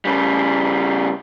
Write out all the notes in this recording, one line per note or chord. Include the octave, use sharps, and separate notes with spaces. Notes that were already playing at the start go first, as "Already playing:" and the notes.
C#3 G3